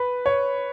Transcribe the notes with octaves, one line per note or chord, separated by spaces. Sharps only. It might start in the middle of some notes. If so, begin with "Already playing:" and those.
Already playing: B4
C#5